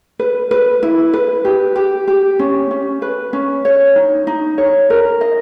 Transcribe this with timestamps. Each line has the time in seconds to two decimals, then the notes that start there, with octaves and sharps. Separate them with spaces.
0.19 B4
0.51 B4
0.83 E4
1.14 B4
1.45 G4
1.76 G4
2.08 G4
2.39 C#4
2.71 C#4
3.02 B4
3.33 C#4
3.65 C#5
3.96 D#4
4.27 D#4
4.58 C#5
4.90 A#4
5.21 D#5